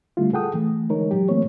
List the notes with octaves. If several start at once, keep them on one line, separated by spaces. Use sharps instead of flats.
D3 G3 A3 E4 F4
G#4 A4 F#5 G5 A5 D#6
E3 A3
D3 E3 G#3 D#4 A#4 C#5
F#3 G4
E3 A3 A#3 C4 C#5